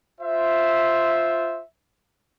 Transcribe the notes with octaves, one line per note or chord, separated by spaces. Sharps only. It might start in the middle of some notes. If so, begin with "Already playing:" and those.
F4 C5 E5